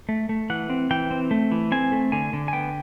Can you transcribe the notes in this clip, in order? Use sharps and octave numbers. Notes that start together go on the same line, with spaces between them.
A3
A3
E3 F#5
C4
E3 G5
C4
A3
E3
C4 G#5
A3
D3 G#5
D3
G#5
B3 G5